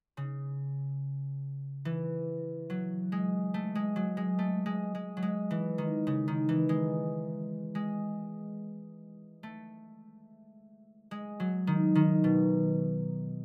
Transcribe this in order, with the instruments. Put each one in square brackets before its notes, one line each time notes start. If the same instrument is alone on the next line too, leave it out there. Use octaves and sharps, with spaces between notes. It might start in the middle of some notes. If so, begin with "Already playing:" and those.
[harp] C#3
E3
F#3
G#3
A3
G#3
F#3
G#3
A3
G#3
G#3
F#3
G#3
E3
D#3
C#3
D#3
E3
G#3
G#3
A3
G#3
F#3
D#3
D#3
B2